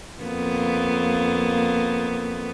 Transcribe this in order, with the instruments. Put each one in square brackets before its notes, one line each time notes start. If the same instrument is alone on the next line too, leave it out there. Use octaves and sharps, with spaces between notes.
[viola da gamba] F2 A#3 B3